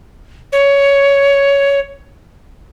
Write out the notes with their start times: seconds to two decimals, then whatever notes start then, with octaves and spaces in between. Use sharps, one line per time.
0.52 C#5